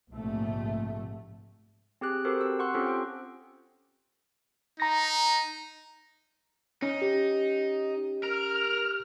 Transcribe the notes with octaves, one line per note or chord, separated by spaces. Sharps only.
A#1 G#2 C3 A3
C4 G4 G#4 F#6
F#4 G4 A4 A#4 C5
C4 E6
F#5 C6 C#6 F#6
C4 C#4 F4 G4 A4 C5
G5
D#4 A#5 A#6
C#4 D#4
G4
A#4 F6